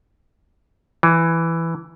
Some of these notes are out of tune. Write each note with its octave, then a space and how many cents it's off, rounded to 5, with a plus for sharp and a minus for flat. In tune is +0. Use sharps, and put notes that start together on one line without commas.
E3 +5